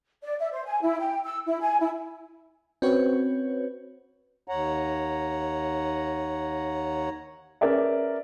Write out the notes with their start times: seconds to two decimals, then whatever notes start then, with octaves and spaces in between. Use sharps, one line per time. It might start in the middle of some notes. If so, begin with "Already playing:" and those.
0.22 D5
0.40 E5
0.53 C5
0.66 G#5
0.82 E4
1.00 G5
1.25 E6
1.47 E4
1.61 G#5
1.80 E4
2.82 C4 C#4 F#4 B4 C#5
4.47 D#2 C#5 F#5 A#5
7.61 C#4 G#4 A#4 B4 D5 E5